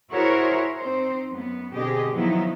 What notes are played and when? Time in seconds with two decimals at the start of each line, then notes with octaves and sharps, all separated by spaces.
0.11 E4 F#4 G#4 A#4 C5 C#5
0.77 C4 D#4 C5
1.31 F#2 B3
1.74 B2 D3 C4 G4 G#4 D#5
2.14 D#3 F3 F#3 B3 D#4 E4